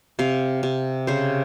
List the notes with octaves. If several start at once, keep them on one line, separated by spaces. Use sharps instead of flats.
C3 F5
C3
C#3 C5